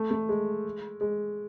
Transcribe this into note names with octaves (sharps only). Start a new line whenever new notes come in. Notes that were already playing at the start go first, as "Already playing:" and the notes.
Already playing: A3
A3
G#3
G#3